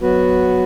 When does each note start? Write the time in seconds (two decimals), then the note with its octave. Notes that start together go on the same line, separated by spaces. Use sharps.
0.02 F#3 B3 F#4 B4